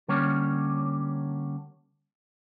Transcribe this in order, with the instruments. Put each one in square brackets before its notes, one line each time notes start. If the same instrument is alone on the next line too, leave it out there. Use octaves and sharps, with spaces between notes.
[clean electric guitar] D3 G3 A#3 C#4 C#5